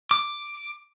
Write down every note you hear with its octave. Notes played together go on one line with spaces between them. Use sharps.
D6